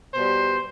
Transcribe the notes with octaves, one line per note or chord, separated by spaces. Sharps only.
B2 G3 C5